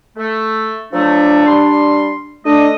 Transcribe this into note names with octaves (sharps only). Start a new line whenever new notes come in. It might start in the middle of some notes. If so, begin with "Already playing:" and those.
A3
F3 F#3 A3 D4
G3 C6
A3 D4 D#5